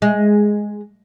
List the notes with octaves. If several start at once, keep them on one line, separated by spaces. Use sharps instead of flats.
G#3